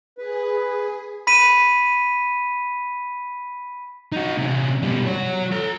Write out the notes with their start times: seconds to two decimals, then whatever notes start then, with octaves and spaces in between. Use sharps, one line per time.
0.18 G#4 B4
1.27 B5 B6 D#7
4.12 D#4 F#4
4.37 C3 C#4
4.83 B2 G3
5.07 F#4 C#5
5.52 A4 A#5